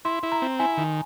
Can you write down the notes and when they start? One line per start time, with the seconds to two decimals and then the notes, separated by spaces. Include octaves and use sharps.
0.05 E4 C6
0.23 E4
0.32 A#5
0.42 C4
0.59 E4 G#5
0.77 D#3